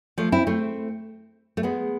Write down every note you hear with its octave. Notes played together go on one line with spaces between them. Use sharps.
F3 A3
C4 E4
A3 C4
A3
G#3 B3